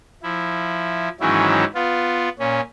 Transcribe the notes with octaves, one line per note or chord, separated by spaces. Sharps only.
F3 E4
G#2 D#3 E3 F#3 C#4 E4
B3 F4
A#2 C#4